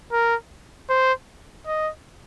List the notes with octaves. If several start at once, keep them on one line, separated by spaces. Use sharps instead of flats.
A#4
C5
D#5